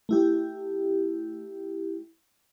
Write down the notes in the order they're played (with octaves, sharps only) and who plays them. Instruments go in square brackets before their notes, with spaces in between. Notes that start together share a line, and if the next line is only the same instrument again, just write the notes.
[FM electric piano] A3 E4 G4